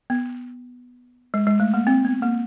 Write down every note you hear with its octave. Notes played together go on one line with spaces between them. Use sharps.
B3
G#3
G#3
A3
A#3
C4
B3
A#3